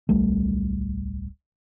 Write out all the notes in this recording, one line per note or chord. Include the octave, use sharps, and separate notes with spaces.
D1 B1 G3 A3